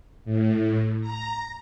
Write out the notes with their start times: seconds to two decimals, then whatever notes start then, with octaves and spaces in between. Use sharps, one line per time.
0.25 A2
1.01 A#5